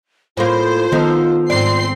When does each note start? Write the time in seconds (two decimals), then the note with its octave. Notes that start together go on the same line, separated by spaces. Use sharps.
0.37 A2 A#3 F4 C5
0.92 D#3 F3 B3 D#4 A4
1.50 G#2 C4 D5 C6 C7